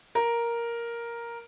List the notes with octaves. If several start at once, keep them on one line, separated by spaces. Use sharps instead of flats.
A#4